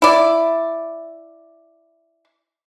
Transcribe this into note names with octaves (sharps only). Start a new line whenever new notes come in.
E4 D5